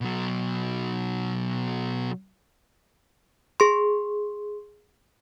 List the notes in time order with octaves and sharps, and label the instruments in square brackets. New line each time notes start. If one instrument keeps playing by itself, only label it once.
[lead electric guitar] B2 F#3
[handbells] G#4 C6